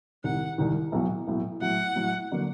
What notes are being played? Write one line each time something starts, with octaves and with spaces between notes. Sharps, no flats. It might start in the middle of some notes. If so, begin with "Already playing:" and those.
C2 C3 D#3 F#5
C2 C3 D#3
B1 A2 F#3
B1 A2 F#3
A2 F#3 A3 F#5
A2 F#3 A3
D3 F#3 A#3